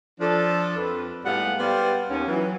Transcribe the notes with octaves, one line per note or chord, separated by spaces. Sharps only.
F3 D4 A4
F2 B4
A2 G3 G#3 B3 F5 F#5
G3 B3 C5 D5 F5
D#2 B3 C#4
E3 F#3